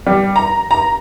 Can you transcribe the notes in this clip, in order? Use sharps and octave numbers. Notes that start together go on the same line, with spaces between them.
G3
A#5
A#5